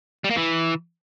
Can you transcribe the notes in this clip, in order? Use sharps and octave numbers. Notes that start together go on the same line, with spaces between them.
G3
A#3
E3